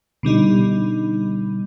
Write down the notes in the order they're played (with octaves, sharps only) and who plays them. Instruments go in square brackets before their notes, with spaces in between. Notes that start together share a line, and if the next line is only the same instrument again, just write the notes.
[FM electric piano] B2 D3 G3 D#4